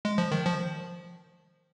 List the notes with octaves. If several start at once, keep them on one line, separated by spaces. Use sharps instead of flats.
G#3
F3
D#3
F3